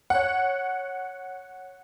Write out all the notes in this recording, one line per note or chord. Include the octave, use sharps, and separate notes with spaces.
C#5 F#5